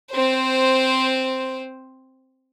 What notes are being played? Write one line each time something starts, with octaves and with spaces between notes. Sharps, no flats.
C4 C5